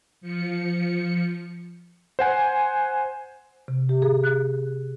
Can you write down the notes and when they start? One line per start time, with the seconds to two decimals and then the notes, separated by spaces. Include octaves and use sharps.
0.21 F3 C#7
2.19 C5 F#5 G#5
3.68 C3
3.89 G4
4.02 G#4
4.24 F#6